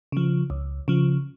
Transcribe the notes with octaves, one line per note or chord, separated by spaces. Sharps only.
C#3 F3
C#2
C#3 F3